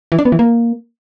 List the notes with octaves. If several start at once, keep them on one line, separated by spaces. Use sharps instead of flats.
E3
D4
B3
E3
A#3